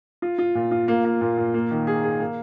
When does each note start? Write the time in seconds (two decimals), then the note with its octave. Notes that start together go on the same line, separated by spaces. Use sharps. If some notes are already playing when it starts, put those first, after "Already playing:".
0.22 F4
0.38 F4
0.55 A#2
0.71 F4
0.88 A#3
1.05 A#3
1.21 A#2
1.37 A#2
1.54 A#3
1.71 D#3
1.87 G#4
2.04 G#4
2.20 A#3